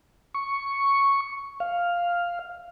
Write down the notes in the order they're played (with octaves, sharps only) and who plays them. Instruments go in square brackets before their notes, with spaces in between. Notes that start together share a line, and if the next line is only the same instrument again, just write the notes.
[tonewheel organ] C#6
F5